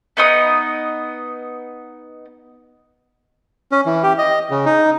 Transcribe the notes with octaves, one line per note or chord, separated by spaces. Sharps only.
B3 D#4 D#6
C#4
E3
G4
D#5
C#3
D#4